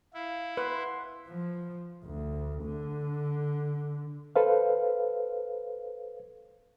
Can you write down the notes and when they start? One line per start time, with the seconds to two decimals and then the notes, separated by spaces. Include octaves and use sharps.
0.14 E4 F5
0.57 B4 F#5 C6
1.27 F3
2.04 D2
2.64 D3
4.36 A4 B4 C5 F5